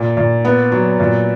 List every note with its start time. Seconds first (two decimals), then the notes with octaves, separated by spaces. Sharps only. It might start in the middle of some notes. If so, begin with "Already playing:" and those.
Already playing: A#2
0.17 A#2
0.45 B3
0.72 F#3
1.00 A#2